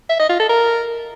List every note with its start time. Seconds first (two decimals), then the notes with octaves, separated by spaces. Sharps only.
0.10 E5
0.20 D#5
0.30 F4
0.39 A4
0.49 A#4